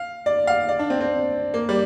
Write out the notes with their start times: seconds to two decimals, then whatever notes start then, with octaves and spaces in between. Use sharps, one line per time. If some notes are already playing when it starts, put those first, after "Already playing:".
Already playing: F5
0.26 D5
0.47 F5
0.69 D5
0.79 D4
0.90 C4
1.01 C4
1.54 A#3
1.69 G3